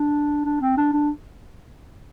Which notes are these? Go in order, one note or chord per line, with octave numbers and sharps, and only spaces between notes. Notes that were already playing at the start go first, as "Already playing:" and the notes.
Already playing: D4
D4
C4
D4
D4